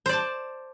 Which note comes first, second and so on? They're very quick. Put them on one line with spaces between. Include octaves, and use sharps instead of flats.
C5 D5 A5